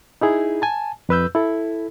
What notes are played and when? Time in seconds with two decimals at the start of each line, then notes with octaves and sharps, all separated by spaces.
0.21 D#4 E4 G#4
0.62 G#5 A5
1.09 F2 B4 E6 G6
1.35 E4 A4